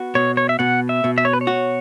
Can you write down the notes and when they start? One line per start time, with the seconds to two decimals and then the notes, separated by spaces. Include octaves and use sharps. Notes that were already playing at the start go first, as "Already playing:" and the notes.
Already playing: B3 F#4
0.15 B2 C#5
0.37 C#5
0.49 E5
0.59 B2 F#5
0.89 E5
1.04 B2
1.18 E5
1.25 C#5
1.33 B4
1.41 C#5
1.47 F#4